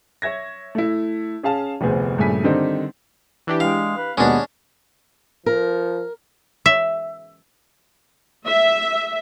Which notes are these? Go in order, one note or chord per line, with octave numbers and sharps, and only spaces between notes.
C#5 E5 G#6 A#6
A3 E4
C#4 G#4 F5 A5
F1 D2 B3 G#4 C5
A#1 G2 C#3 A3 G#5 B6
D3 D#3 G3 C4 D4 D#4
E3 D4 G4
G#3 F5
B4
D#2 B2 G#3 B3 C#4 D4
F3 A#4
E5
E5